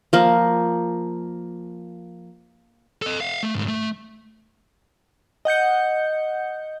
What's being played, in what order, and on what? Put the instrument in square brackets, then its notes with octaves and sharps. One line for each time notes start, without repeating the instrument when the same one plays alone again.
[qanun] F3 A#3
[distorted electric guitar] A4 D#5
F5 F#5
A3
D2 G#2
A3
[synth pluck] D#5 F#5 G6 C#7